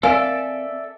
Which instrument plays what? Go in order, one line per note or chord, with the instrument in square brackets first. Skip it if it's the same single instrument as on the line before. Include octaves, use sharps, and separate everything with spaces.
[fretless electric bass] C4 [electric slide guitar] A4 D5 E5 [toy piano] A#4 G#5 [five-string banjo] F5